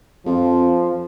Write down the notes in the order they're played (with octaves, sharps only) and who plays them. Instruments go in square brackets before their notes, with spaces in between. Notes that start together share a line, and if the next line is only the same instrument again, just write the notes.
[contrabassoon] F2 [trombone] F3